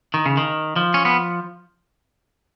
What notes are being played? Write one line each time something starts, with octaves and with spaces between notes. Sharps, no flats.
D#3
C#3
D#3
F3
C#4
B3